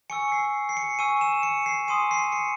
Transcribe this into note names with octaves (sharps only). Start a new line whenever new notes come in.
G#5 C#6 E6 C#7
C7
C7
C#7
G#5 C#6 E6 D#7
E7
C#7
C7
G#5 C6 D#6 D#7
C7
C#7